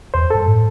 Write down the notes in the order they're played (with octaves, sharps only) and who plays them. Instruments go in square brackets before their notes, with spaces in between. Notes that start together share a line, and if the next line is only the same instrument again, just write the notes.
[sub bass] E2 [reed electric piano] C5
[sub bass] G2 [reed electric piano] A4
[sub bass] A2